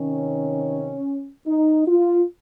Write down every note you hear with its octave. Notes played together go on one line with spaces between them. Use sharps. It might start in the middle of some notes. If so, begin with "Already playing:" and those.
Already playing: C3 D#3 C#4
D#4
F4